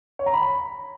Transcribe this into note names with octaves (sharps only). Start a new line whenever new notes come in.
C#5
A#5
B5